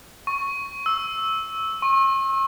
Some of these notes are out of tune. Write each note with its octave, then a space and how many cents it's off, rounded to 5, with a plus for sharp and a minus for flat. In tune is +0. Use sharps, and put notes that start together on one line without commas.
C#6 -5
E6 -10
C#6 -45